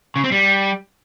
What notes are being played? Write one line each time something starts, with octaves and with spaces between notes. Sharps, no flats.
C#3
C4
G3